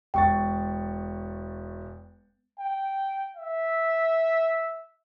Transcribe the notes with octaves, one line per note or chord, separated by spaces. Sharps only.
E1 G5 C#6 A6
G5
E5